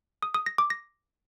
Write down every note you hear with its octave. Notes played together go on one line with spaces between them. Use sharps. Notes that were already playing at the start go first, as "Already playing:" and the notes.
D#6
D#6
A#6
D6
A#6